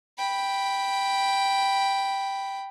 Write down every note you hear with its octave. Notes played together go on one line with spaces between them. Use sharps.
G5 B5